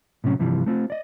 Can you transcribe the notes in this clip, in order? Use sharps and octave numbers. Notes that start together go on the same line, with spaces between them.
A2 C3 F#3 C#4
G2 C3 E3 F3 G3
A3 C4 F4
D5 D#5